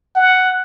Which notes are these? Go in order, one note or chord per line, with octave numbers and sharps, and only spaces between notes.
F#5